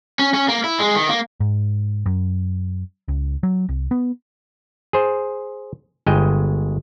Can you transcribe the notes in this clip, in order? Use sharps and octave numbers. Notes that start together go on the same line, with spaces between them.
C#4
C#4
A#3
E4
G#3
D#3
A#3
G#2
F#2
C#2
F#3
C2
B3
G#4 C5
G1 G#3 D#5 G5